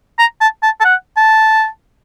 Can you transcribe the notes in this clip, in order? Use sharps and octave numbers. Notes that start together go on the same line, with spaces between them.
A#5
A5
A5
A5
F#5
A5